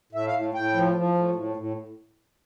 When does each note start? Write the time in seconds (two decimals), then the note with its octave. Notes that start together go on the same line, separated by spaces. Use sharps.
0.13 A2 E5
0.27 F5
0.33 A2
0.54 A2 G5
0.74 F3
0.95 F3
1.15 A2
1.35 A2
1.57 A2